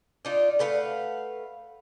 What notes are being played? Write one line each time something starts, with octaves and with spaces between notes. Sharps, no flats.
D4 D#4 F4
A3 B4 F5 F#5